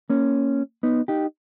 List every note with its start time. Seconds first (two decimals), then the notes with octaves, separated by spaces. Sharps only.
0.10 A#3 C#4
0.83 B3 D#4
1.08 D#4 G4